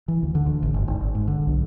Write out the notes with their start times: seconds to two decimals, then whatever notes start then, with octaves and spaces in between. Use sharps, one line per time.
0.08 E3
0.23 D2
0.35 D3
0.46 D2
0.63 A1
0.74 G1
0.88 G#1
1.00 G#1
1.15 G#2
1.28 D3
1.47 B1